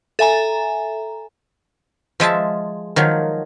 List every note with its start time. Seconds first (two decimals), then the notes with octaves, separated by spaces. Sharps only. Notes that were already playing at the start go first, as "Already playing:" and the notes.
0.19 A4 E5 G#5 A#5
2.20 F3 G#3 E5 A5
2.96 D#3 F3 F#3